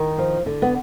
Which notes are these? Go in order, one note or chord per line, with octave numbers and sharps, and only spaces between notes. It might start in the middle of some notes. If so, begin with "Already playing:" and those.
Already playing: D#3
F3
D3
B3